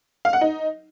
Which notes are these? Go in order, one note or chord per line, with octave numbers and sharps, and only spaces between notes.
F5
F#5
D#4